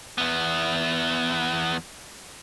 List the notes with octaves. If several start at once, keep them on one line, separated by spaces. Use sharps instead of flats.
E2 B3